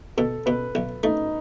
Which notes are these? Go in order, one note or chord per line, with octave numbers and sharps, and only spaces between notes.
B2 A4
B2 B4
B1
A3 D#4